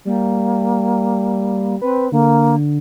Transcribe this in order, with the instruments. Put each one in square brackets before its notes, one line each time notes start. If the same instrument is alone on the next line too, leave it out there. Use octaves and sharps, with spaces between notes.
[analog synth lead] G3 [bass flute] A#3
[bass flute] C4 [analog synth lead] B4
[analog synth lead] D3 [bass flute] A#3